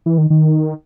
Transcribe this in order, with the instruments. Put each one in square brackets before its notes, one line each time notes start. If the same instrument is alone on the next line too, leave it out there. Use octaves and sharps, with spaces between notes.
[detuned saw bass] E3
D#3
D#3